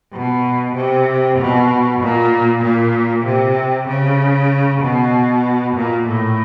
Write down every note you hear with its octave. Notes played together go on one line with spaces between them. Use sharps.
B2
C3
B2
A#2
A#2
C3
C#3
B2
A#2
A2